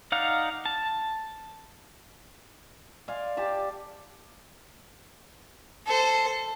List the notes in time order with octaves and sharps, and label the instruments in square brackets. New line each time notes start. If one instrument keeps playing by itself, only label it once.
[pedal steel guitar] D#4 D5 F5 F#5
A5
[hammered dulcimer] D5 F5 G#5 C6
G4 A5
[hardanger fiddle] A4 C5